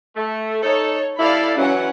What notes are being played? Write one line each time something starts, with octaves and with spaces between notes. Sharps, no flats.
A3
D#4 A4 C#5
G3 E4 A4 D5 F5 B5
E3 F#3 C#4 F#5